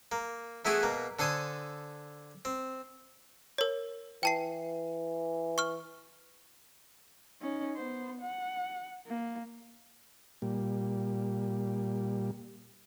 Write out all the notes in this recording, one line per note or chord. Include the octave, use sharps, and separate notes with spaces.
A#3
E3 A3 B3 E4 F#4 G#4
B2 A#3
D3 A4 C5 G#5 D#6
C4
A#4 C#5
E3 G5 A5 C7
C#6 F6
C#4 D#4
B3 C5
F#5
A#3
A#2 G3